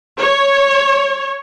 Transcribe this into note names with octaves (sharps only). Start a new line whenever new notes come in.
C#5